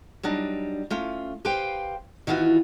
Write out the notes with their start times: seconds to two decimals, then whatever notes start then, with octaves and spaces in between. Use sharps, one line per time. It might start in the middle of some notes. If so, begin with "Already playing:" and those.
0.23 F#3 G3 D4 D#4
0.90 A3 C#4 F4
1.45 G4 B4 C5 F5 G5
2.27 D#3 E3 B3 F4 F#4